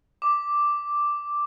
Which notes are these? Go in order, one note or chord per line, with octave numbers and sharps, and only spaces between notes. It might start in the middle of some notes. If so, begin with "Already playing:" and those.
D6